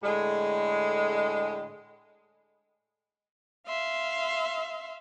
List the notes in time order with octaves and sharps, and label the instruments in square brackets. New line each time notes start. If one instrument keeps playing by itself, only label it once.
[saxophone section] A2 D3 G#3
[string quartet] E5 F5 C6